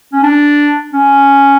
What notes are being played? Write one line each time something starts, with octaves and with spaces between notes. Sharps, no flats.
C#4
D4
C#4